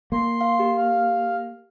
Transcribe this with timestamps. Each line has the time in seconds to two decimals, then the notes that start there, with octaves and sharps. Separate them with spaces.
0.12 A#3 C6
0.41 F5
0.59 G4
0.77 F5